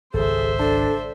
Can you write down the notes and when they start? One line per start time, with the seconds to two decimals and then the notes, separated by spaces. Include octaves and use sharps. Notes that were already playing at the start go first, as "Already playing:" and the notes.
0.14 G#1 C#2 G#4 A4 C5 E5
0.59 D4 A4